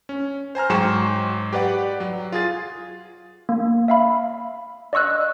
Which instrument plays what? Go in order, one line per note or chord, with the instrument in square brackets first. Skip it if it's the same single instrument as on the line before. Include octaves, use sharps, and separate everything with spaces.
[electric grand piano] C#4
C5 G#5 A#5 F6
G#2 F#3 G#4 G5 C#6 E7
G4 B4 D5 F#5
F#3
F4 G#4 A6
[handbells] A#3
E5 F5 B5
D5 D#5 C#6 E6 F#6